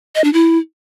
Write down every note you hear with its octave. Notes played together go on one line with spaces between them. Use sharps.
D#5
D4
E4